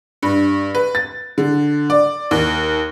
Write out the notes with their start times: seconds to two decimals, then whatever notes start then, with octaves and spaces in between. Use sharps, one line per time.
0.23 G2
0.75 B4
0.95 A6
1.38 D3
1.90 D5
2.31 D#2